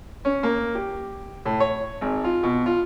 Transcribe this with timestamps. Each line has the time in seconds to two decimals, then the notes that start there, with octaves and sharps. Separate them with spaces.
0.25 C#4
0.43 A#3
0.75 G4
1.46 A2
1.60 C#5
2.01 G#1
2.24 F4
2.43 B2
2.66 F4